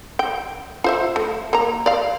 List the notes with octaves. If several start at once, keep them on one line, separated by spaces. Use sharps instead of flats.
G5
F4 C5 E5
A3
A#3 A#5
D5 F5